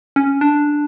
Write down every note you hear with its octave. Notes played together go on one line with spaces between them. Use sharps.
C#4
D4